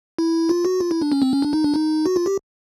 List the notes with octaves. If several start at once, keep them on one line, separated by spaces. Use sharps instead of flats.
E4
F4
F#4
F4
E4
D4
C#4
C4
C#4
D4
D#4
D4
D#4
F#4
F4
G4